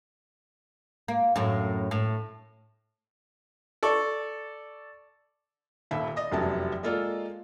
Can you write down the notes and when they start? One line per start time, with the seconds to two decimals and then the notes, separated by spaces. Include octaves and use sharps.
1.08 A#3
1.36 F#2 A2
1.91 A2
3.83 A4 D5 C#6
5.91 D#1 D#2 E5 B5
6.16 D5 D#5 D#6
6.31 F1 F#2 E3 F#3 G3 A5
6.83 G#3 A#3 F4 A4 D5